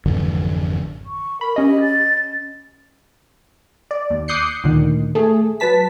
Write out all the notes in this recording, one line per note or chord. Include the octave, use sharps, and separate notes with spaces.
G#1 F2 D3 E3
C#6
A#4 B5
C#4 G4 D#5
A6
D5
D#2
D6 D#6 F#6 G6 C7 C#7
D2 A#2 D#3
A3 G#4
F#3 B4 A5 B6